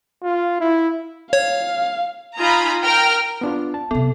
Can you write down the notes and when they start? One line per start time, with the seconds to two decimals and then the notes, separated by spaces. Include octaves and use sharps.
0.22 F4
0.61 E4
1.33 C#5 F5
2.37 D#4 F4 G#5 A#5 B5
2.83 A#4 G5 F6
3.41 B3 D4 F4
3.74 A5
3.91 C3 F#3 B3 A4